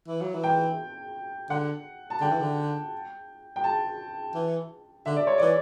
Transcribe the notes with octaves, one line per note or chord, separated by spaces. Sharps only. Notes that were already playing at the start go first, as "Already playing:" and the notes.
E3
F#3
E3
G5
D3 F#5
A5
D3 G5
E3
D3
G5
A5
E3
D3 E5
D5
C#5
E3 D5